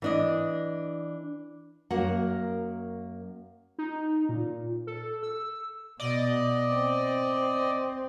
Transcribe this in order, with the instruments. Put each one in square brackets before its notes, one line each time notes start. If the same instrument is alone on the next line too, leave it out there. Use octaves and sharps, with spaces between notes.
[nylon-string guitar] E3 D4 D#5
F#2 A#3 F#4 A#4 F#5
[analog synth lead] D#4
A#2
A4
E6
[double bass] B2 [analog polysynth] D5 D#5
[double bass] C4